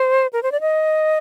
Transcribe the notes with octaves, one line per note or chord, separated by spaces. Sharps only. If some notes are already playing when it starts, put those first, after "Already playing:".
Already playing: C5
A#4
C5
D5
D#5